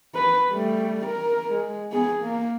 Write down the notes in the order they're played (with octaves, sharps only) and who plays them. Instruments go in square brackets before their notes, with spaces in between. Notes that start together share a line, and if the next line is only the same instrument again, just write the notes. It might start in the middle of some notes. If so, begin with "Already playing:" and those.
[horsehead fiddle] B4
G3 A3
A#4
G#3
B3 G#4
A#3